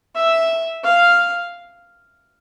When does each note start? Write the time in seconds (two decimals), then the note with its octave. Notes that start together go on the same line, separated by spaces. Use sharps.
0.15 E5
0.84 F5